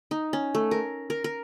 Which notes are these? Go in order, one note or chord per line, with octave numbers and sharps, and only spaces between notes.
D#4
C#4
A3
A#4
A#4
A#4